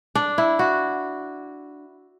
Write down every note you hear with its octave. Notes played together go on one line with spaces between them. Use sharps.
D4
E4
F#4